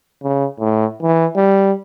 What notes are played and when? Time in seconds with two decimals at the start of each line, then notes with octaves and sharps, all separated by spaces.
0.23 C#3
0.59 A2
1.02 E3
1.36 G3